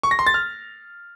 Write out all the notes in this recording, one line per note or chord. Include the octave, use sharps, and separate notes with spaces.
C#6
A#6
C6
A6
F6